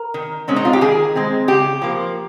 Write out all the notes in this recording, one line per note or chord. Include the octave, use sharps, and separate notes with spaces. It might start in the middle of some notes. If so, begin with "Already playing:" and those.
Already playing: A#4
D#3
G#3 C4 C#4
D#4
F4
G4
D#3 G#4
G#3 C4
C#3 G4
F3 A#3